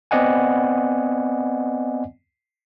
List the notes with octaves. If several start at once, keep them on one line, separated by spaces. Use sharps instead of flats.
B3 C4 D5 D#5 F#5 G#5